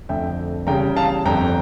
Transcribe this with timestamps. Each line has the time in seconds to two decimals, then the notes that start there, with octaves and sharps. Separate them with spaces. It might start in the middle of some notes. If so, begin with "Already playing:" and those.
0.09 F2 D3 A3 E5 G5
0.67 E2 C#3 G3 G5 A#5
0.96 F5 A5
1.25 G1 F2 D3 G5 A#5